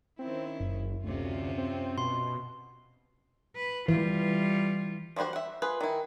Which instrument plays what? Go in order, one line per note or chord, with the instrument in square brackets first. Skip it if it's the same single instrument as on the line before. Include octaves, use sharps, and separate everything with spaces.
[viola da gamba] D#3 C#4 E4 [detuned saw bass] C4
[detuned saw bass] F#1 [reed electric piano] F#2
[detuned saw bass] D2 [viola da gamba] C3 C#4 F4
[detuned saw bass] C4
[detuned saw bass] B2 [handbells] C6
[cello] B4
[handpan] E3 [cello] G3 F4
[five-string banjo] F3 G3 E4 F#4 C5
E5 F#5
F4 G#4 B4
D#3 E4